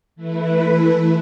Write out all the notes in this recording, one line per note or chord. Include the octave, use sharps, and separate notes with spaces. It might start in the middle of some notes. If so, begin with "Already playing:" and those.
E3 A3 E4 B4